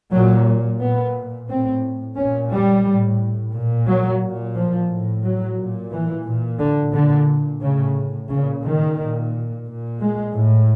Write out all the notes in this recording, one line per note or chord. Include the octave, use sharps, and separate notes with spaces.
A#2 F#3
A#2 B3
A2 C4
A#2 C#4
G3
A2
A#2
F#3
A#2
F3
A2
F#3
A#2
E3
A#2
D3
A#2 D3
A2 C#3
A#2 C#3
D#3
A#2
A#2
G#3
A2